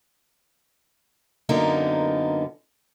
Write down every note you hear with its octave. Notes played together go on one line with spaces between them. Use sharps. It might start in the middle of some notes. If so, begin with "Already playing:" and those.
F#2 D3 A#3 B3 D#4 A#5